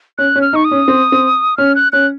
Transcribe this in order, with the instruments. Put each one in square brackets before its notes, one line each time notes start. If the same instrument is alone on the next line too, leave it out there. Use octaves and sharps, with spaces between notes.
[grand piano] C#4 [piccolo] F#6
[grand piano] C#4
[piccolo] F6
[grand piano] D#4 [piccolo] C#6
[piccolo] D#6
[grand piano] C#4
C4
C4
[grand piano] C#4 [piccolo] F6
[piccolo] F#6
[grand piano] C#4 [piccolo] F#6